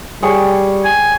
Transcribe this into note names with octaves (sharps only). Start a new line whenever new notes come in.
G3 G#4 C#5 G5
G#5